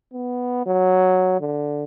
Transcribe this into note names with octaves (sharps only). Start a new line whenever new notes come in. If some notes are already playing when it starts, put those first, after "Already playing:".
B3
F#3
D3